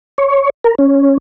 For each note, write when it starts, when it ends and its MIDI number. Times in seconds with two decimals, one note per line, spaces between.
0.18 0.50 73
0.64 0.75 70
0.79 1.18 61